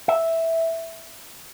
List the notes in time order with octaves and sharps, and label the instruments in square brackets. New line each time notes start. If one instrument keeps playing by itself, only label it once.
[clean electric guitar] E5